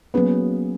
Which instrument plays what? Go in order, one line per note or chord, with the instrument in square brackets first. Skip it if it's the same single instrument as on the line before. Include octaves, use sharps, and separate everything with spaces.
[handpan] F#3 A#3 C#4 G#4 [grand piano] B3